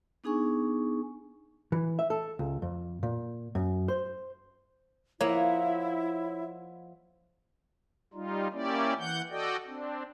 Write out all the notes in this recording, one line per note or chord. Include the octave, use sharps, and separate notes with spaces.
B3 D4 D#4 G#4 G#5 C#6
E3
E5
A4
C#2
F2
A#2
F#2
C5
F3 A#3 E4 C#5 D#5 F#5
G3 D#4 F4
A#3 C#4 E4 G4 D5
E3 F#5 G6
F#4 A4 D5 D#5 G5
C4 D4